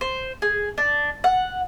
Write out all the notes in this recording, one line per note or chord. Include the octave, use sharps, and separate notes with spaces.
C5
G#4
D4
F#5